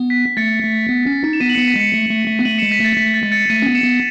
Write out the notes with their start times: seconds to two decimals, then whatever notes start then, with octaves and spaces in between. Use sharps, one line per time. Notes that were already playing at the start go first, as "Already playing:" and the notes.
Already playing: B3
0.10 B6
0.37 A3 A6 C#7
0.63 A3
0.89 B3
1.06 C#4
1.24 D#4
1.33 E7
1.40 B3 B6 D#7
1.49 F#7
1.54 B3 C#7 E7
1.67 B6 D#7
1.76 G#3 C#7 E7
1.94 A3
2.11 A3
2.28 A3
2.39 B3
2.45 A3 D#7 F#7
2.58 G#3 C#7 E7
2.71 B6 D#7
2.80 A3 A6 C#7
2.97 A3 B6
3.14 A6
3.23 G#3
3.32 A6 C#7
3.49 A3 B6 D#7
3.62 C#4
3.67 B3
3.75 C#7 E7
3.84 B3